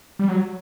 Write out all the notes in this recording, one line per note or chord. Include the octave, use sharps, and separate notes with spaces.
G3
F#3